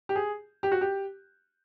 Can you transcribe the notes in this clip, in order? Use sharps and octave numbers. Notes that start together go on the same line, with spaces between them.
G4
G#4
G4
F#4
G4